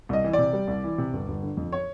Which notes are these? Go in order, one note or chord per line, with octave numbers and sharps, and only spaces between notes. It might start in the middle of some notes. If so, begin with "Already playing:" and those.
C2 D#5
E3
C3 D5
G3
C2
E3
C3
G1
G1
D3
F2
C#5